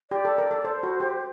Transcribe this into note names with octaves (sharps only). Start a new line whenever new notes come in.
G4 D5
A4
A#4
A4
A4 C5
F#4
G4